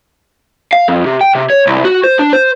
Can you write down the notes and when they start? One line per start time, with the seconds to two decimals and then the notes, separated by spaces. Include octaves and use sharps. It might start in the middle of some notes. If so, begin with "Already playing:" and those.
0.73 F5
0.88 F2
1.06 C3
1.21 G5
1.35 C3
1.50 C#5
1.67 C2
1.84 F#4
2.04 C5
2.19 D4
2.33 C5